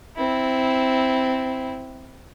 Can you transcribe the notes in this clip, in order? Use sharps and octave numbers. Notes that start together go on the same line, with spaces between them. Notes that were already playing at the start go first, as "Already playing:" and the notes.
C4 E4